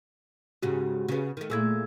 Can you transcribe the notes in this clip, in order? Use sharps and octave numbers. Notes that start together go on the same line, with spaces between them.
G#2 C#3 F#4 G4
C#3 B3
D#3 A3
A#2 A3 E4 G#4 E6 G#6